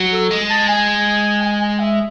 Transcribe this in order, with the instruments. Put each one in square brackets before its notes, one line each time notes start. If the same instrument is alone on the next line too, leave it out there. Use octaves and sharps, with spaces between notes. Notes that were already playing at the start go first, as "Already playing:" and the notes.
Already playing: [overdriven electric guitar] F#3
[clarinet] A4
[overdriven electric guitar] G#3
[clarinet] A5
G#5
G#5
G#5
E5